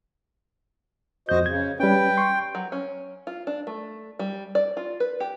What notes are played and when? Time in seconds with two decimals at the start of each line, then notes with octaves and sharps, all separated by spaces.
1.29 F2 F#4 C5 D#5 G6
1.46 C#3 G#6
1.80 G3 C#4 B4 G5
2.17 C6 C#6
2.55 F#3
2.72 C#4
3.27 F4
3.47 D4
3.67 A3
4.19 G3
4.55 D5
4.77 F4
5.00 B4
5.20 G4